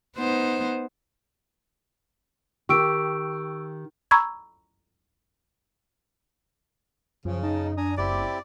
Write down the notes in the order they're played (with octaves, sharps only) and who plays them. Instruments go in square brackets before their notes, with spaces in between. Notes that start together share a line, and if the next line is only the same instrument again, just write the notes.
[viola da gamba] B3 D#4 C5
[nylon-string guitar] D#3 G4 [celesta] C#6 E6 D7
[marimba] A#5 B5 C#6 E6 G#6
[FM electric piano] F#2 [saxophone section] C#3 [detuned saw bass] F3
[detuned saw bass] D#4 [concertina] D#5 A5
[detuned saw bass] D4 [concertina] G#5 A#5 D#6
[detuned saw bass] F#1 [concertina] C4 E4 G4 [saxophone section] D5